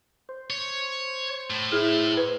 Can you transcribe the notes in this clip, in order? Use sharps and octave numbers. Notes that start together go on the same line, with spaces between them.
C5
C#5
A2
E4 G#4
B4